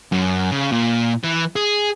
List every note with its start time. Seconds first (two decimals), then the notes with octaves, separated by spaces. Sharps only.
0.12 F#2
0.51 C#3
0.72 A#2
1.24 E3
1.56 G#4